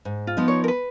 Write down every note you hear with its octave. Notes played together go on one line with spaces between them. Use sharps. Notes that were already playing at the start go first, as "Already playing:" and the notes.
G#2
F4
F3 B3 D#4
C#5
A#4
B4